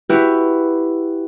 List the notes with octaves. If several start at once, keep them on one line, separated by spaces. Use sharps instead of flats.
E4 F#4 G4 B4